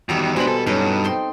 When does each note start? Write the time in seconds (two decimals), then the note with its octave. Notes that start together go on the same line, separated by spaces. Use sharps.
0.09 E2 D#3 G3 F#4 C#5
0.36 B2 G#3 D4 C5 G#5 B5
0.48 A4
0.67 G2 F#3 C#4 D#4 F#4 A4
1.04 C4 G5 C6